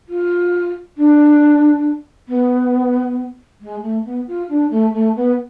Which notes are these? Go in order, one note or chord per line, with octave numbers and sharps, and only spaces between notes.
F4
D4
B3
G#3
A3
B3
F4
D4
A3
A3
B3